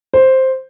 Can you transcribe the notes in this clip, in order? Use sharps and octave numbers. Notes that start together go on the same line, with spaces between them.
C5